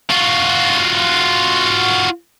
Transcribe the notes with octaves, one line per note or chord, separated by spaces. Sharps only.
F4 F#4